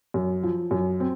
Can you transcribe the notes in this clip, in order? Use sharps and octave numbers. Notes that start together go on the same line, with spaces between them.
F#2
F3
F#2
C4